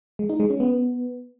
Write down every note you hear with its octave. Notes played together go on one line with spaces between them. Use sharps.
G#3
D#4
G#3
C#4
B3